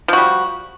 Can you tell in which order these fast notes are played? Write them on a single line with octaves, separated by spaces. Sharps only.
F3 F#4 G3